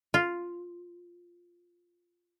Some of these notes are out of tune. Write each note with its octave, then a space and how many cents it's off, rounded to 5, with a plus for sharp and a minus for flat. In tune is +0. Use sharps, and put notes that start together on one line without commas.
F4 +0